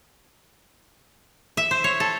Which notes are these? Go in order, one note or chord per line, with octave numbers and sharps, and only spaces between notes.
E5
C5
C#5
A4